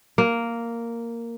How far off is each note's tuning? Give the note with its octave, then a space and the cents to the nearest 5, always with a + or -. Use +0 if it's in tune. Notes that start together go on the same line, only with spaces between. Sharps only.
A#3 -5